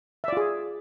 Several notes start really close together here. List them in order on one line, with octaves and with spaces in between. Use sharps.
E5 D5 F4 G#4